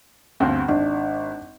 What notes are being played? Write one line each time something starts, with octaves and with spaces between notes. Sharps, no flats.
G1 D2 C4
G#1 D4